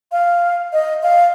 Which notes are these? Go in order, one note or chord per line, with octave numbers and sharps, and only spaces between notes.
F5
D#5
F5